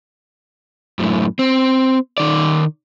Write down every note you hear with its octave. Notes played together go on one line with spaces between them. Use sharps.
F#2 A2
C4
D#3 D5